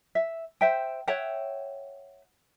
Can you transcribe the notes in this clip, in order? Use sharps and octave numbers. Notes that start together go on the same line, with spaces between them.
E5
C5 E5 G5
C#5 E5 F#5 G5